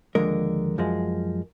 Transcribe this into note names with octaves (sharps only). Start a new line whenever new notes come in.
D#2 D3 F3 G#3 A#4
F#2 F3 G#3